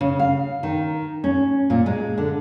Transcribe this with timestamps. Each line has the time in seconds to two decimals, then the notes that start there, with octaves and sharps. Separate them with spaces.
0.01 C#3
0.19 F5
0.63 D#3
1.24 C#4
1.70 A#2
1.86 G#3
2.18 D3